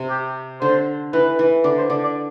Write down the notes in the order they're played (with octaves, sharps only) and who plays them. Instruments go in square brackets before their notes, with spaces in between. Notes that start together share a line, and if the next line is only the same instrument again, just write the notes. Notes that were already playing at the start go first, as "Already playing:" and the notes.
Already playing: [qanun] C3
[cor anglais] G4
[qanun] D3 [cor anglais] C5
[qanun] E3 [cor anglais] B4
[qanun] E3
[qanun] D3 [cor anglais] D5
[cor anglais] C5
[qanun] D3 [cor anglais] D5
[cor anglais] D5